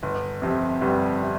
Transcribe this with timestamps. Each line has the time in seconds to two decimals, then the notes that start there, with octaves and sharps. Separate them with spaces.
0.03 G1
0.42 F2 C3
0.81 G1 G3
1.22 C3